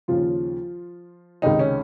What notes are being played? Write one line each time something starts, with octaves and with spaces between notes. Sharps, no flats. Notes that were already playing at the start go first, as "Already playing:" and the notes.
D#2 C#3 F3 F4
C#2 C3 D#3 D#4
C#4